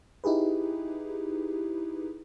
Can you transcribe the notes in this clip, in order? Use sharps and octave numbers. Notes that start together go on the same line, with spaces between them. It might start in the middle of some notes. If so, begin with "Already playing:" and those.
D#4 E4 G4 G#4 B4